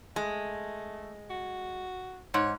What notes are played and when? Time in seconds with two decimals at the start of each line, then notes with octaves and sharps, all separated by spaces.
0.16 G#3 A3
1.30 F#4
2.34 G#2 C#5